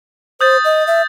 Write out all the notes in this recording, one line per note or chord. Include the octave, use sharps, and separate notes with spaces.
C5 D#6 G6 A6
D#5
E5